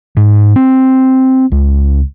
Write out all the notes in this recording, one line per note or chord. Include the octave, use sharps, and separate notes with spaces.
G#2
C4
C#2